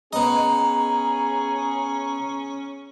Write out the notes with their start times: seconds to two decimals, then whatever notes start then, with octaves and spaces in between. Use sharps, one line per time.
0.13 B3 C#4 G#4 D#5 A#5